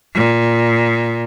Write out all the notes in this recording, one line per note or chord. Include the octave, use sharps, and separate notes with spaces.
A#2